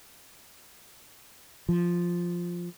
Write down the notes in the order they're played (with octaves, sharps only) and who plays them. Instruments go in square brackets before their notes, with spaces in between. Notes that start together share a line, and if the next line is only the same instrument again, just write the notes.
[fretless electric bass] F3